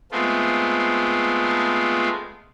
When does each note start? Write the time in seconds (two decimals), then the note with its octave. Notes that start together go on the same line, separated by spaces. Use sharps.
0.12 G#3 A3 B3 C4 F4